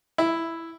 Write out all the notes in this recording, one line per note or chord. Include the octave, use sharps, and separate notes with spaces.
E4